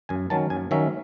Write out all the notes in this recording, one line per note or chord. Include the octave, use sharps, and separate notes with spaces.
F#2 G#5
D#3 F#3 C#4 A5
F#2 G#5
D#3 F#3 C#4 E5